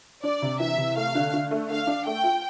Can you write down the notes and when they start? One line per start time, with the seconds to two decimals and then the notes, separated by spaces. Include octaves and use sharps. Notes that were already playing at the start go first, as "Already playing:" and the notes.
0.23 D4 D5
0.42 C3
0.60 E3 E5
0.78 C3
0.96 A3 F5
1.15 D3
1.34 D3
1.51 A3
1.70 A3 F5
1.87 D4
2.06 A3 G5
2.23 F4